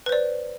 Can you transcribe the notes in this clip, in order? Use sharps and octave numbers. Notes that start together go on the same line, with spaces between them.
B4 C5 D5